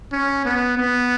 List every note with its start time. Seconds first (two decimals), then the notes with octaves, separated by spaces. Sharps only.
0.12 C#4
0.45 B3
0.77 B3